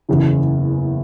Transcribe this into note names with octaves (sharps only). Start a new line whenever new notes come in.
F#1 E2 C#3 E3